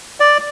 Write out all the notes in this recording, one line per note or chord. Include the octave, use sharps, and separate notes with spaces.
D5